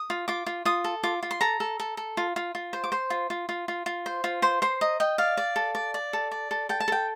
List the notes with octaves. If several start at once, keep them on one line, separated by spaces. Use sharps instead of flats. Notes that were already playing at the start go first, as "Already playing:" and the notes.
Already playing: D#6
F4
F4 D6
F4
F4 D#6
A4
F4 D6
F4
C6
A4 A#5
A4
A4
A4
F4
F4
F4
C5
D6
C5 C6
F4
F4
F4
F4
F4
C5
F4
C5 C6
C5 C6
D#5 A#5
D#5 G5
D5 F5
D5
A4
D5
D5
A4
D5
A4
A4 G5
A5
A4 G5